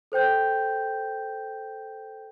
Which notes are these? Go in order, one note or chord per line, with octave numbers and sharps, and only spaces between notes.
A4 C5 G5 G6